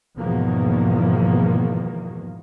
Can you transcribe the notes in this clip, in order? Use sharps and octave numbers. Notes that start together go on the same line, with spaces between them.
E2 G#2 B2 D#3 F3 A#3